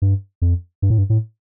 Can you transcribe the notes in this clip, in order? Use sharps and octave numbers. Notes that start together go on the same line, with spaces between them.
G2
F2
G2
A2
G2
A2